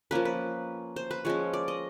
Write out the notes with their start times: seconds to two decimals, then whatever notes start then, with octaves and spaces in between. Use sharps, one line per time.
0.11 F3 A#3 C#4 B4
0.25 B4
0.96 C5
1.11 B4
1.25 F3 G#3 C#4 C#5
1.53 D5
1.68 D#5